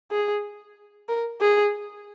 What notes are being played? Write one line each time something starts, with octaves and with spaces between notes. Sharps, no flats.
G#4
A#4
G#4